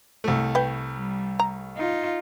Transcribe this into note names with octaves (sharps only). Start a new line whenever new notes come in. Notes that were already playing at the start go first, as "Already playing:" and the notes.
C2 A3
B4 G5
G3
A#5
D#4 F4